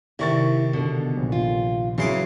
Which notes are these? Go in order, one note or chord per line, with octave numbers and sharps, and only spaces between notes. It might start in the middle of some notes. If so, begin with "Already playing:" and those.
C3 D#3 E4 D5 C#6 A6
B2 D3
A#1
F4
C#3 E3 F#3 C#4 C6 D6